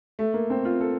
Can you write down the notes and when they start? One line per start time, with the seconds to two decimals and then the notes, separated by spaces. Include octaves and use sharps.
0.19 A3
0.34 A#3
0.50 C4
0.65 F4
0.81 A4